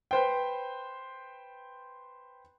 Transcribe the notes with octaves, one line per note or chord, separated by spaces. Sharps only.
B4 C5 G5